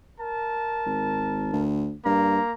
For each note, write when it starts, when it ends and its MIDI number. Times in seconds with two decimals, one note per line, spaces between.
0.21 1.66 70
0.21 1.66 81
0.86 1.53 32
1.53 1.94 38
2.06 2.39 43
2.06 2.53 58
2.06 2.53 82